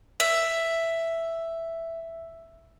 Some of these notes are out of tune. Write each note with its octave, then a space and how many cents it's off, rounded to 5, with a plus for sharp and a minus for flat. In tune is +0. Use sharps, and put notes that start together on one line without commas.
E5 +5